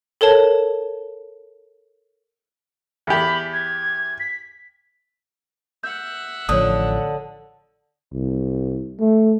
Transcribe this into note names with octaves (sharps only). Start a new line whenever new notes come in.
A4 A#4 C#5 A5
E2 G4 B5
G#6
B6
E5 F#5 G6
A1 D3 F3 C#5 D#6
C2
A3